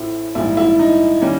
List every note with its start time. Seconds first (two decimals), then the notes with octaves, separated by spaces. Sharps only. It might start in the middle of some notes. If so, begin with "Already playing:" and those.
Already playing: A1 A2 F3 A3 C4 E4
0.35 A#1 G#2 E3 G3 E4
0.57 E4
0.79 D#4
1.21 D#3 G3 A#3 C#4